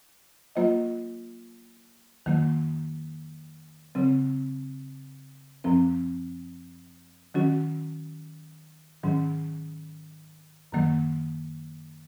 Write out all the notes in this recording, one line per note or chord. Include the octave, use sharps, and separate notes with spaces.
F#3 A#3 F4 C5 D#5
F2 D#3 F#3 A#3
C#3 F#3 C4
F#2 F3 C4
D#3 F#3 C#4 F#4
G#2 D#3 F#3 C#4
F#2 D#3 F#3 A#3